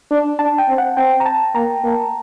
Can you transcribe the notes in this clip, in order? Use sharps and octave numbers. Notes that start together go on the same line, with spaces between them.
D4
D4 A5
G5
C4
F#5
C4 G5
A#5
A5
A#3 A#5
A#3